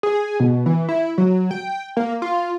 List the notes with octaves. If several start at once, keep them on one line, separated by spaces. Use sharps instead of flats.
G#4
B2
E3
E4
F#3
G5
A#3
F4